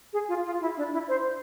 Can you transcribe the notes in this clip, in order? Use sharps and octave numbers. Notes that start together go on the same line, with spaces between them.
G#4
F4
F4
E4
D4
E4
C5